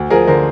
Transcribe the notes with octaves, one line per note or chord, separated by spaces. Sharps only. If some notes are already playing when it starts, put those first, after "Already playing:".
Already playing: D2
F3 G#4 A#4
D3 A#4 C5